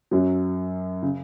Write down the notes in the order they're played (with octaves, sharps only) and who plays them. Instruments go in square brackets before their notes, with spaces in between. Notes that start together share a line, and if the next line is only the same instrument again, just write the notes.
[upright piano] F#2 F#3
C#3